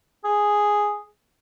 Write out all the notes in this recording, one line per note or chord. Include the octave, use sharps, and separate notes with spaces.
G#4